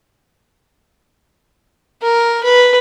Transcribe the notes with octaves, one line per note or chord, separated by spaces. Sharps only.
A#4
B4